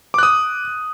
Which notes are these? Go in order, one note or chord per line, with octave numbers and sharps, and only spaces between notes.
D6 D#6 F#6